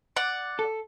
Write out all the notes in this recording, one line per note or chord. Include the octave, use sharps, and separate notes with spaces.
D5 F#5
A4